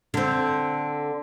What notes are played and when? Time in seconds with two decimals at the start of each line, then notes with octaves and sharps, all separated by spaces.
0.14 D3 C4